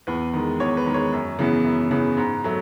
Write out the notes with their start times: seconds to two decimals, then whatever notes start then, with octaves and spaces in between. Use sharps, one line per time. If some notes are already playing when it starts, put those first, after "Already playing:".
0.07 E2 B4
0.33 D#3 G#3
0.60 E2 C#5
0.77 B4
0.86 D#3 G#3
0.94 C#5
1.13 F#2
1.39 C#3 E3 B3
1.65 F#2
1.91 C#3 E3 B3
2.17 G#2
2.44 F#3 A3